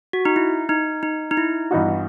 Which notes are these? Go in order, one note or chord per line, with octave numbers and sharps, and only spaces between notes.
F#4
D#4
E4
D#4
D#4
D#4
E4
G2 E3 B3 D#4 F#4